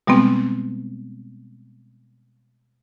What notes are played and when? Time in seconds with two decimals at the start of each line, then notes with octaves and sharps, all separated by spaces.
0.07 B2 G3 G#3 B3 C4